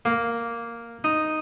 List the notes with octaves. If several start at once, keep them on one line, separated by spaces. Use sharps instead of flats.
A#3
D#4